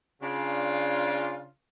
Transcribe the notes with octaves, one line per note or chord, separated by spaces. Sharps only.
C#3 D4 F4